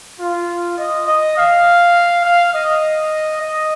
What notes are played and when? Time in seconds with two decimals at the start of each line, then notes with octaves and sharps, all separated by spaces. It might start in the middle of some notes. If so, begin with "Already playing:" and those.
0.19 F4
0.78 D#5
1.07 D#5
1.37 F5
2.24 F5
2.54 D#5
3.41 D#5